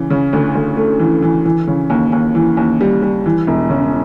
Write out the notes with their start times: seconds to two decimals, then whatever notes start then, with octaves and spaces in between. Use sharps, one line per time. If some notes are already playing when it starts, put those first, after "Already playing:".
Already playing: C#3 E3
0.10 C#3
0.33 D2
0.55 D2
0.77 A3
1.00 E3
1.22 E3
1.45 E3
1.67 C#3
1.90 D#2
2.12 D#2
2.35 E3
2.57 D#2
2.81 G3
3.02 G3
3.26 E3
3.47 E1
3.70 C#3